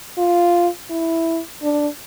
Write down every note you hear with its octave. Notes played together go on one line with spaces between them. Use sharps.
F4
E4
D4